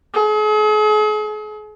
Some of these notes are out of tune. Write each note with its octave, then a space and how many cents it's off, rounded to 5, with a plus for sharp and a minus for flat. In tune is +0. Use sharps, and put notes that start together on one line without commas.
G#4 +40